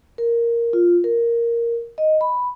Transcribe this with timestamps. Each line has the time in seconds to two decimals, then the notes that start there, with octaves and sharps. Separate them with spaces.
0.18 A#4
0.73 F4
1.04 A#4
1.98 D#5
2.21 B5